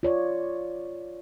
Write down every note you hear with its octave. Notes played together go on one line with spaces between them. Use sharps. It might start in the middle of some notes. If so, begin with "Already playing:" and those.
F4 C#5 D5